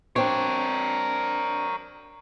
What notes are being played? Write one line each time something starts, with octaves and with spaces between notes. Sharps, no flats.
C4 D4 A#4 C#5